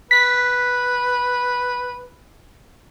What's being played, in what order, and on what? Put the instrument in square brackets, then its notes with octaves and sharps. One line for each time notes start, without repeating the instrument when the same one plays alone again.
[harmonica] B4 [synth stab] B6